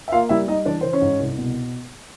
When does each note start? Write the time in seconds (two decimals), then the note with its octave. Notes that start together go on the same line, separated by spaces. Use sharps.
0.08 E5
0.12 A#3 F4 F5
0.29 G3 E4 E5
0.48 G3 D#4 D#5
0.65 E3 D4 D5
0.81 E3 C5
0.93 C#4 C#5
1.01 G#2
1.20 C2
1.38 B2